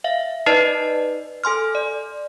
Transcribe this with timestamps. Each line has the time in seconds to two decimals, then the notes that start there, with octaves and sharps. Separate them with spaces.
0.04 E5 F5
0.46 D#4 B4 D5 D#5 A5 C7
1.44 A4 G#5 C6 F6
1.75 D5